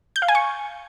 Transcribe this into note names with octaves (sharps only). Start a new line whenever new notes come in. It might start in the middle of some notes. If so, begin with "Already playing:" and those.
G6
F5
G#5
C#6